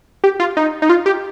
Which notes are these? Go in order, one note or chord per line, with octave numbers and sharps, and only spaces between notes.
G4
F4
D#4
D#4
F4
G4